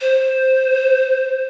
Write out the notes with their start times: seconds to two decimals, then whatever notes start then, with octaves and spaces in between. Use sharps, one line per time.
0.01 C5